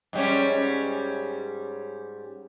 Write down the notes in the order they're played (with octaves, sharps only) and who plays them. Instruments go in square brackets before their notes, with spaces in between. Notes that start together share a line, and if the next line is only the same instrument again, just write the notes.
[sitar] G#2 G3 C#4